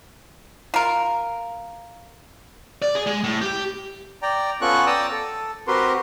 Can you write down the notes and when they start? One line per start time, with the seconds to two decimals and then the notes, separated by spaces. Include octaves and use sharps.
0.74 F4 A#4
2.82 D5
2.95 G#4
3.07 G#3
3.24 A2
3.41 G4
4.22 D5 G5 A#5
4.62 B3 C#4 F4 A4 C#6 F#6
4.86 D5 G5 A5 A#5 D#6 E6
5.12 A4
5.68 C4 F#4 G4 A#4 B4 C6